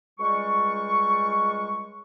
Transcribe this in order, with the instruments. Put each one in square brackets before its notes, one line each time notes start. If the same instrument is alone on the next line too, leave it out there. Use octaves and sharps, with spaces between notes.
[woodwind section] C#2 G3 G#3 C#6